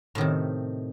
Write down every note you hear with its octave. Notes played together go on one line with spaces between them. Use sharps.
A2 C3 D#3